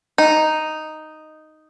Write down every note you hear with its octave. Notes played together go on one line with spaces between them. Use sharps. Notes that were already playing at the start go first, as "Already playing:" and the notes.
D#4